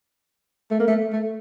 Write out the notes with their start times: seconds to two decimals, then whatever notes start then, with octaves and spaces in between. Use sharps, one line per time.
0.71 A3
0.80 A#3
0.88 A3
1.13 A3